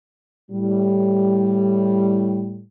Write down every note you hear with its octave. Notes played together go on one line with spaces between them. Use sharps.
A2 G3